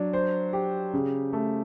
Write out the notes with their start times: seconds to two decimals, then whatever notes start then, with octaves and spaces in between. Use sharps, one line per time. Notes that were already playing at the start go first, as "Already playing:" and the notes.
Already playing: F#3 D4
0.13 C5
0.53 G4
0.93 C#3
1.33 A3